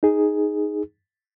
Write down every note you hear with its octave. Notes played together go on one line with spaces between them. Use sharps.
D#4 G#4